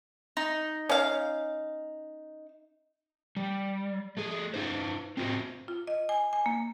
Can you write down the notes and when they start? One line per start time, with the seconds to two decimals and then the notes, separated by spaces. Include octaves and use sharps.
0.37 D#4
0.89 C#4 F5
3.37 G3
4.17 A3 G#4
4.54 D#4 B4 C5
5.17 C4 F4 F#4 B4 C5
5.68 F4
5.87 D#5
6.09 G#5
6.33 G#5
6.46 A#3